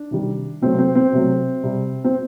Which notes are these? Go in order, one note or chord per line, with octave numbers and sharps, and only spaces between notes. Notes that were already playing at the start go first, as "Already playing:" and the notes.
Already playing: D4
C3 D#3 G3
C3 F#3 A3 C4
C4
C4
C3 F#3 A3
C3 G3
C4